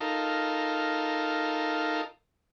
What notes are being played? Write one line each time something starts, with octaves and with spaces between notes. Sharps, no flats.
D#4 F4 A4 A#4